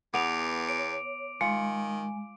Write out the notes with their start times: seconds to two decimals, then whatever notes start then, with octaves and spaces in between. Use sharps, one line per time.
0.14 E2 B3 D6 D7 F7
0.69 C#5 D7
1.41 D#3 G#3 F4